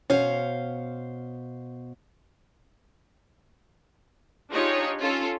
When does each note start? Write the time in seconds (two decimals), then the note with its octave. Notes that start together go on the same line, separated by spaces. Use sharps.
0.10 B2 C#4 C5 F5
4.51 D4 D#4 F4 G4 G#4 C#5
5.00 C#4 F4 A4